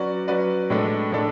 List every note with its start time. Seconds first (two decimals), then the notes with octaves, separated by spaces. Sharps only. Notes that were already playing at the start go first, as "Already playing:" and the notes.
Already playing: F#3 C#4 F#4 B4 D5
0.28 F#3 C#4 F#4 B4 D5
0.70 A2 G#3 D4 A4
1.12 A2 G#3 D4 A4